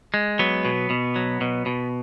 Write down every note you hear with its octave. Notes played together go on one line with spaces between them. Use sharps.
G#3
F#3 B3
B2
B2
F#3
B2
B2